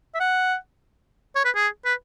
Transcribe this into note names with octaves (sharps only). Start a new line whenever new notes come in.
E5
F#5
C#5
B4
G#4
B4